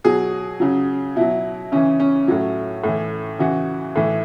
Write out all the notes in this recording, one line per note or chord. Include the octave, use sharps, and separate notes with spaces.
B2 F#3 G#4
C#3 F#3
B2 F#3 E4
C#3 E3 C#4
C#4
A2 F#3
A2 E3
C#3 E3 F#4
A2 E3